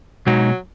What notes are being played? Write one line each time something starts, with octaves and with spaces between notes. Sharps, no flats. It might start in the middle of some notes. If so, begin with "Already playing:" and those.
B2 F#3 G#3 D#4